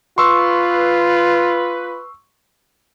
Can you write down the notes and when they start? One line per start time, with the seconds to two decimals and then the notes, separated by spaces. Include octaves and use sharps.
0.18 F4 B4 C6 C#6 E6